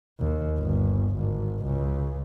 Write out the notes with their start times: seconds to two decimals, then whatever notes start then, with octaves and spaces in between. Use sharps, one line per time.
0.19 D#2
0.59 G1
1.15 G#1
1.64 C#2